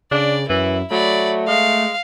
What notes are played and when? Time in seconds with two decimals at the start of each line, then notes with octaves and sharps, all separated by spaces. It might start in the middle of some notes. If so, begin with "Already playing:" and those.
0.11 C#3 D4 D5
0.50 F#2 E3 E4
0.91 F#3 A3 D5 B5
1.47 G#3 F5